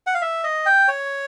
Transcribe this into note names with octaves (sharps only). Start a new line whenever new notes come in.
F#5
F5
E5
D#5
G5
C#5